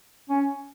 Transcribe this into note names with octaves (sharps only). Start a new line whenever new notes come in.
C#4